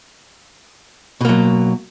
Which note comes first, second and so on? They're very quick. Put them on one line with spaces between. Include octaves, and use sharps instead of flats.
B2 A#3 F#3